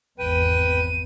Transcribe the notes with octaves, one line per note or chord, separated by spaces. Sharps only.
G#1 E2 B4 G5 D#7